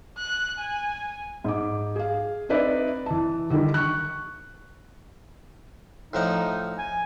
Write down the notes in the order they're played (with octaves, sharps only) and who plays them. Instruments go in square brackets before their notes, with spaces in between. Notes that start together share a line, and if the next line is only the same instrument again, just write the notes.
[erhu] F#6
G#5
[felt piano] G#2 D6
G#4 F5
C4 D#4 B4 D5 E5
E3 A5
D3 D#3 G3 E4 G4
C#6 F#6
[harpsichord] A2 F3 F#5 [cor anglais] D#4
[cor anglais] G#5